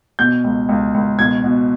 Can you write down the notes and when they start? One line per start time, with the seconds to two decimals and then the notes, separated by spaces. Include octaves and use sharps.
0.19 B2 G6
0.44 C#2
0.69 C#2
0.94 C#2
1.19 B2 G#6
1.44 B2